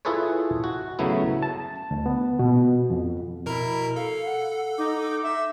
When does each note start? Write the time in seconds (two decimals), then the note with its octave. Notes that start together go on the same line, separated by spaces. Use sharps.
0.05 E4 F4 G#4 A4 B4 C#5
0.64 F#4
0.99 C#3 F#3 A3 B3 E4
1.43 A5
1.91 D2
2.06 B3
2.39 B2
2.90 F2
3.46 B2 E4 A#4 A#5
3.96 A4 F5
4.26 F#5
4.78 D#4 D6
4.99 D6
5.23 E5